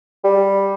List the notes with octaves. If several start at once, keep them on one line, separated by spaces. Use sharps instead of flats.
G3